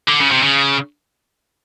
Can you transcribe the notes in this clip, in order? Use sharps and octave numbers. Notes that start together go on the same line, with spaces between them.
D3
C#3
C3
C#3